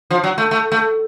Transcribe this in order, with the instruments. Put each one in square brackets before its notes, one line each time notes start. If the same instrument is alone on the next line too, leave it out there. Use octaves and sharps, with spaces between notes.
[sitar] F3
F#3
A3
A3
A3